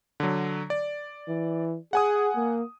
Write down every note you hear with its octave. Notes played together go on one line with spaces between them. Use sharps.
D3 F#3
D5
E3
G#4 F#5 G#5 D#6
A#3